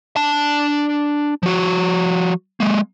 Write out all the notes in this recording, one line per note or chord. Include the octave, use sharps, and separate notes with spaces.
D4 A5
F3 F#4
G#3 A#3